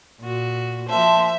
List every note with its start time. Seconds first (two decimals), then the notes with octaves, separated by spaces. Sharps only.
0.20 A#2 F#4
0.89 F3 A#3 C5 E5 A5 C6